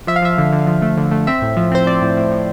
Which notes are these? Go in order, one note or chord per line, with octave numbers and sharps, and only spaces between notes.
F3 E5
F5
F3 E5
D3
D3
F3
A3
D3
A3
C4 E5
A2
F3
C4 C5
C4 D5
A2
A2
A2